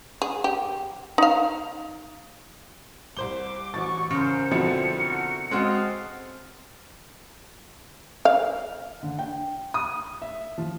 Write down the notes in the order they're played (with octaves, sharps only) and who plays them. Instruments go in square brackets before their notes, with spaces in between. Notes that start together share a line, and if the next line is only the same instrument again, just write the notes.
[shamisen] G#4
G4
D#4 F5
[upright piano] C2 C5 G7 [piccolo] D6
[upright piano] A1 F#4 A6 [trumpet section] C#6
[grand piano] C#3 [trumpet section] A#4 C5 [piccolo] C#7
[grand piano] F2 F3 C4 [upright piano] B2 D3 E4
[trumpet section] A3 F#4 A#4
[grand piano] G#3 C4 F#4 [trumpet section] A4 D#5 F5
[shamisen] F5
[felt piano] D3
G5
D#6
E5
F3